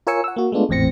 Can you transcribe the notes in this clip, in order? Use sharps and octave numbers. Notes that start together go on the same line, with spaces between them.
F4 A#4 C#5 G#5 E6 C#7
F#5 E6
A#3 F#4
G#3 A3 B3 D4 F4
G#1 E2 A2 C4 A#6 C#7